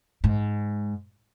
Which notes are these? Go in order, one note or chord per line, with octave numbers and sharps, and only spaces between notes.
G#2